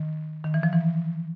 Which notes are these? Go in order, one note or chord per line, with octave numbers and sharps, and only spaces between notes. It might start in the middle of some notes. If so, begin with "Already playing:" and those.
Already playing: D#3
D#3
E3
F3
E3